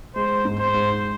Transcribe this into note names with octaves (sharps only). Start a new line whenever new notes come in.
G#3 C5
G#2
C5
G#3